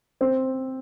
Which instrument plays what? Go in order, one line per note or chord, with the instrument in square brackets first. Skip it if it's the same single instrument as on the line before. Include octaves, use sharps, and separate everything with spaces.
[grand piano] C4 C5